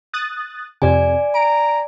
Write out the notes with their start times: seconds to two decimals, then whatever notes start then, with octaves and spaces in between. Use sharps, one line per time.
0.13 D#6 F#6 A6
0.82 F2 C3 D5 G#5
1.35 A#5 D7